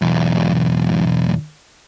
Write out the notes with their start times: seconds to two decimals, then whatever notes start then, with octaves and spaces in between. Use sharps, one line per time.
0.02 B1 E2